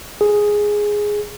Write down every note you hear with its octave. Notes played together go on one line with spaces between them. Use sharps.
G#4